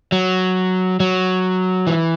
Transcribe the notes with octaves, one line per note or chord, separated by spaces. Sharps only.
F#3
F#3
E3